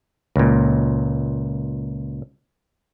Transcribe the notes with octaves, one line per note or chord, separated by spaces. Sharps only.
C#2 A#2